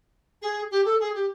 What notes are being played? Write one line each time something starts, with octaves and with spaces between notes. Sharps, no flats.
G#4
G4
A4
G#4
G4